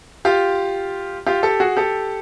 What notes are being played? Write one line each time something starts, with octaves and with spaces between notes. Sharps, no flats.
F4 G4
F4 G4
G4 A4
F#4 G#4
G4 A4